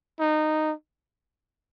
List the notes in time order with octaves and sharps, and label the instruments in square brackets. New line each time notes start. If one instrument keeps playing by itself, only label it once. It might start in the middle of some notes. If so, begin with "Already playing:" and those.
[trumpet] D#4